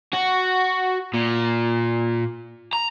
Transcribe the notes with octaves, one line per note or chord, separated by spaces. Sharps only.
F#4
A#2
A#5